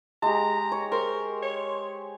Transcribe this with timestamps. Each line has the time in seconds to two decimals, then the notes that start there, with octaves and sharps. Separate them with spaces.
0.22 G#3 G4 A#5
0.72 C#5
0.92 A#4 C5
1.43 C#5